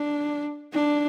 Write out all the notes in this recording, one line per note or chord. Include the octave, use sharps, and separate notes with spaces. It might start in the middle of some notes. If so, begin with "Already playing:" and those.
Already playing: D4
D4